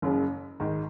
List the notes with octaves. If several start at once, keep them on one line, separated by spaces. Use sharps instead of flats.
F#1 F#2 C#3
G#1 G#2 D#3